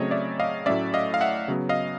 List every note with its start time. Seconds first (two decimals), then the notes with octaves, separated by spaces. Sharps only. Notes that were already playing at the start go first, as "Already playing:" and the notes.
Already playing: C#3 F#3 A3 C4 C#5 D#5
0.11 D5 E5
0.40 D#5 F5
0.66 A2 F#3 A3 C#4 D5 E5
0.94 D#5 F5
1.14 F5
1.21 E5 F#5
1.48 C#3 F#3 B3
1.69 D#5 F5